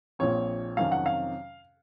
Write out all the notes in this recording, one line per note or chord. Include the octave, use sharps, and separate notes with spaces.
A#1 A#2 F3 C4 C#5
F2 C3 D#3 F#3 C#4 F5
F#5
F5